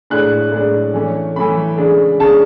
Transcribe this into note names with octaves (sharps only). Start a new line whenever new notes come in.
A2 G#3 D4 F#6
A2 G#3 D4
E3 A3 C#4
E3 A3 C#4 B5
C#3 G#3 D4
C#3 G#3 D4 A5